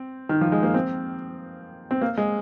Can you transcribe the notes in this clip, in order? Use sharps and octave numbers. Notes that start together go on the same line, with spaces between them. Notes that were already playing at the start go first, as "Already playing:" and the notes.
Already playing: C4
D#3
F3
G#3
A#3
C4
C4
A#3
G#3